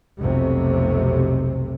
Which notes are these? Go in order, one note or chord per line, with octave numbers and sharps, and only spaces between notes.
F1 B1 C3